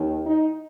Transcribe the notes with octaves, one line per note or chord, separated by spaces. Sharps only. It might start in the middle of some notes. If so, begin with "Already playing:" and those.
Already playing: D#2 D#3
D#4